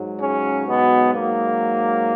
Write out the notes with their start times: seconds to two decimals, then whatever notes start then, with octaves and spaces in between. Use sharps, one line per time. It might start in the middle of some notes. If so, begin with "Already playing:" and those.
Already playing: G#2 F#3
0.21 C#3 C#4
0.67 B2 B3
1.15 A#3